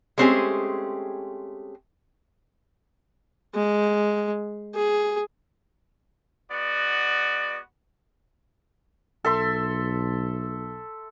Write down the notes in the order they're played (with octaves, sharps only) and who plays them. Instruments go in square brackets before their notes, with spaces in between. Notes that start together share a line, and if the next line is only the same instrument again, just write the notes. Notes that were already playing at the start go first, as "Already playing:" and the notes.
[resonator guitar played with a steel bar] G#3 A3 C4 C#4 G4 G#4
[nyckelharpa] G#3
G#4
[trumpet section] G#3 B3 F#4 D5
[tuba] B1 [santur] A4 E5 C6